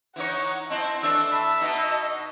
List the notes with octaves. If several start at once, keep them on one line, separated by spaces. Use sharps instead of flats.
E3 D#4 C#5 F#5
C4 E4 D#5 A5
E3 A3 D4 E6
E5 A5 B5
B2 D#4 D#5